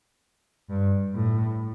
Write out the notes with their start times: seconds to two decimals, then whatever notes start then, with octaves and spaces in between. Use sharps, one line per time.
0.70 G2
1.15 A2